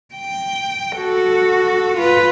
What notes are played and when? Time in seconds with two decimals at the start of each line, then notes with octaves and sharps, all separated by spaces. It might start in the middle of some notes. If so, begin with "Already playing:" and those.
0.15 G5
0.97 F#4 A4
1.97 F4 B4